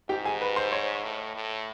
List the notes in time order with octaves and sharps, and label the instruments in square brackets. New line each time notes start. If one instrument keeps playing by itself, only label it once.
[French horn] G#2 [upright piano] G4 G5
[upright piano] G#4 G#5
B4 B5
C5 C6
C#5 C#6
[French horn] A2
A2